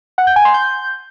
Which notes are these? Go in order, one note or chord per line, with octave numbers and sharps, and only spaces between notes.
F#5
G6
G#5
C6
G6